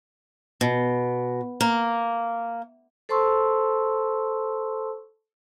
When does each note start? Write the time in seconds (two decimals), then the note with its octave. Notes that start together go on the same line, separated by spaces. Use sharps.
0.61 B2
1.61 A#3
3.09 A4 C5 A5 C6 C#6 E6